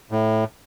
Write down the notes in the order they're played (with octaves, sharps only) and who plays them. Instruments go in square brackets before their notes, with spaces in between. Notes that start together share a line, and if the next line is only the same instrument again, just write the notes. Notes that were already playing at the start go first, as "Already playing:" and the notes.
[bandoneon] A2